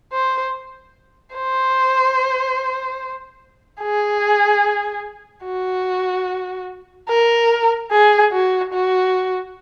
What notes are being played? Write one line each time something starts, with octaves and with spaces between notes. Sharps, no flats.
C5
C5
G#4
F#4
A#4
G#4
F#4
F#4